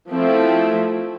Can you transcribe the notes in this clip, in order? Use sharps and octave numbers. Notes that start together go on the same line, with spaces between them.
F3 A3 C4 E4